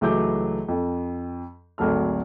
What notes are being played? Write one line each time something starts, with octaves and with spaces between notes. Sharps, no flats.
C#2 E3 F#3 A3 D6 G6
F2
G#1 D2 F#3 A4 F6